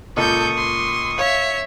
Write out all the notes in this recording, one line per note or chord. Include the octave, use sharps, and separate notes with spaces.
C#2 A#2 A4 C#6 D#6 G6
C6
C#5 E5 F5